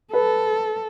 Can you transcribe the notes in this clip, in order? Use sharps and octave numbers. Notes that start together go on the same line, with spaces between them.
A4 B4